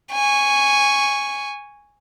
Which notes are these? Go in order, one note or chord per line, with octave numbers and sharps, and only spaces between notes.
G#5 C#6